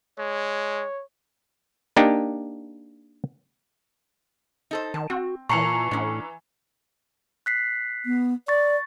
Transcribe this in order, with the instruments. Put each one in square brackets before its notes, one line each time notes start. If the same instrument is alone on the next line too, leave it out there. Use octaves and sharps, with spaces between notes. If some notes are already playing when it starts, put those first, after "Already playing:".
[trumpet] G#3 [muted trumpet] C#5
[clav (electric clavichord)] A#3 D4 D#4 G4
[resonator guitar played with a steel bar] D#4 A4 C5
[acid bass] D#3 [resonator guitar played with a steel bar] A5
[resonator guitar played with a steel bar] C4 [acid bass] F#4
[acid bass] A#2 [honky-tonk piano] E3 A#5 [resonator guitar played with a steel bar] A#3 A5 [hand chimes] C#6 C7 C#7
[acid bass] A2 [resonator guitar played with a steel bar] C#4 D4
[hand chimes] F#6 B6 C7
[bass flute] B3
[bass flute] D5 [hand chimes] C#6 A6